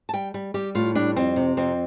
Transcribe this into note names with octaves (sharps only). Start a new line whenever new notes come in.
A5
G3 G5
G3
G3 G4
A2 F4
G3 D4
F2 C4
C3
F2 C4